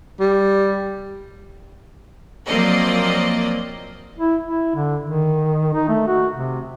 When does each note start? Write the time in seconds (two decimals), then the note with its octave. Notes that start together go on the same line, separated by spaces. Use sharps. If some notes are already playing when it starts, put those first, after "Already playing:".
0.20 G3
2.47 F3 F#3 A#3 C4 D5 D#5
4.19 E4
4.44 E4
4.76 D3
5.02 D#3
5.74 D#4
5.89 A3
6.07 F#4
6.33 C3